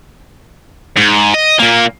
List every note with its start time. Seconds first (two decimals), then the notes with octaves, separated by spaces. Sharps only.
0.97 G#2
1.34 D#5
1.59 A#2 A#3